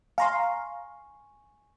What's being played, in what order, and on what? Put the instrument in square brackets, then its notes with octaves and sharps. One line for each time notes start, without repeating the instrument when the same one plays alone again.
[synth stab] F5 A#5 C6 [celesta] G#5 C#6